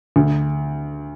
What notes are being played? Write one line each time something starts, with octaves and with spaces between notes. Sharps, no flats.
D2